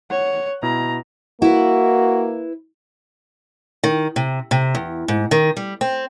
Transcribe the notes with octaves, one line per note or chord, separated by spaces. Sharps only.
C#5 F#5
B2 E4 A#5
A#3 E4 F#4 B4
D#3
C3
C3
E2
G#2
D#3
G3
C4